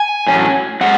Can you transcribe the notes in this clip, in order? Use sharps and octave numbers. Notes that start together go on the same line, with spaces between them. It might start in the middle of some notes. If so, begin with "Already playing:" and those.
Already playing: G#5
A2 F#3 C#4
G#3 C#4 F#5